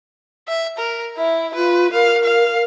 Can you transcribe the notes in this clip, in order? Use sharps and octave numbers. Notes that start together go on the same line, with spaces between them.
E5
A#4
E4 E5
F4 B4
A#4 F5
F5